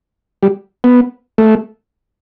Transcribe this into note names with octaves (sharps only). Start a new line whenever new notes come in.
G3
B3
A3